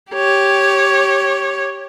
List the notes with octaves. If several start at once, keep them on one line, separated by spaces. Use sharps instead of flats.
G4 C#5